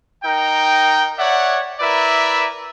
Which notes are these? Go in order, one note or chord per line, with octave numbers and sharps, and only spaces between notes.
D#4 A#4 G5
C#5 D5 E5 F#5
E4 A#4 B4 D5 E5